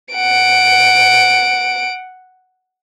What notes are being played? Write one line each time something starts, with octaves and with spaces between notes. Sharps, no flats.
F#5 D7